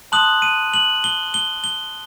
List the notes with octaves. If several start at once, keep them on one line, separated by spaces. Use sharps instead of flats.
A5 C6 D#6 F#6 F#7
D#7
F#7
G7
G7
G7